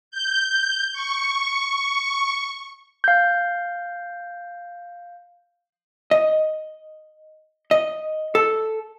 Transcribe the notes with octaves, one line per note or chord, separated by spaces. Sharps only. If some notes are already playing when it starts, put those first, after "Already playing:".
G6
C#6
F5 G6
D#5
D#5
A4